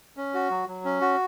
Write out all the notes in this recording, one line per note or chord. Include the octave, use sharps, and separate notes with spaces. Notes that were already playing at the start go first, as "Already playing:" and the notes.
C#4
F#4
F#3
F#3
C#4
F#4